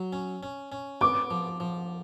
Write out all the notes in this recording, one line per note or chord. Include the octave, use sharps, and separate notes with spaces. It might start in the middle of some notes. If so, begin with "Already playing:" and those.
Already playing: F#3
C#4
C#4
C#4
B3 D6
F3
F3